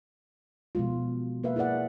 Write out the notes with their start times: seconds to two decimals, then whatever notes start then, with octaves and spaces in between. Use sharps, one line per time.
0.75 B2 F3 G#3 F4
1.44 A#3 B4 E5 F5
1.56 E4 G#4 B4 D5 F#5